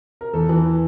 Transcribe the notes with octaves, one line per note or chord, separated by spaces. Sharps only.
A#4
E2 A4
E3